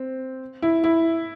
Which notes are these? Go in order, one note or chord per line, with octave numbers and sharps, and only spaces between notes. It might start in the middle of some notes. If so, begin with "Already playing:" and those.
Already playing: C4
E4
E4